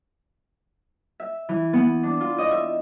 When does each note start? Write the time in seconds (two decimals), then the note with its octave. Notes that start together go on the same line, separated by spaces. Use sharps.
1.20 E5
1.49 E3
1.73 B3
2.03 D4
2.21 F4
2.38 D#5
2.51 E5